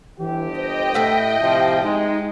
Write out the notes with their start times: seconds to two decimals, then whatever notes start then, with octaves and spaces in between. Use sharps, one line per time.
0.18 G1 D3 E3 G4
0.55 C5 D#5 G5
0.94 A2 A3 E5 F#5
1.41 C3 F3 G4
1.83 G#3 D#4